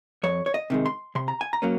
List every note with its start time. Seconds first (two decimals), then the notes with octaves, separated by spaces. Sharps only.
0.23 F2 C#5
0.46 C#5
0.54 D#5
0.70 C3 D#3 G#3
0.86 C6
1.15 C3 C6
1.28 A#5
1.41 G#5
1.53 A#5
1.62 F#3 A#3 C#4